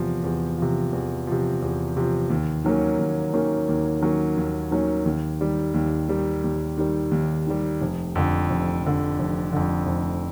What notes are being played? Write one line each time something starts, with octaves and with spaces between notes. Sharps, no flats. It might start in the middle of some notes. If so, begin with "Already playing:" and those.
Already playing: E2 C3 F3
E2
C3 F3
E2
C3 F3
E2
C3 F3
D#2
D#3 F#3 A#3 C#4
D#2
D#3 F#3 A#3 C#4
D#2
D#3 F#3 A#3 C#4
D#2
D#3 F#3 A#3 C#4
D#2
D#3 G3
D#2
D#3 G3
D#2
D#3 G3
D#2
D#3 G3
F1
F2 D3
F1
F2 D3
F1
F2 D3
F1